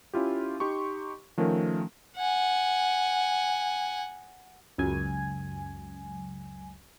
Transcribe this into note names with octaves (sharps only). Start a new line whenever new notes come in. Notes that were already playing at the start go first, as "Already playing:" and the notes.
C#4 E4 F4 G4
D#4 G4 C6 C#6
D#3 F3 A3 C#4 A#4
F#5 G#5
C#2 F#2 G#5